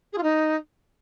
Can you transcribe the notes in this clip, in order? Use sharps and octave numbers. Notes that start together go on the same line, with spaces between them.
G#4
F4
D#4